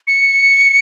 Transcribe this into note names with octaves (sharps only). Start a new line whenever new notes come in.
C#7